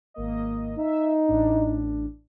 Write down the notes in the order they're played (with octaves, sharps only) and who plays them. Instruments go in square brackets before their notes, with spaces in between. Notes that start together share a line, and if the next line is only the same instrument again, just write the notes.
[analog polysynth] G#1 A#3 D#5
[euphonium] D#4 [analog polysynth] E5
[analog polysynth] A1 A2 D4